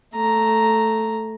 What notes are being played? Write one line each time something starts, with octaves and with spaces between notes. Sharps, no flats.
A3 A#5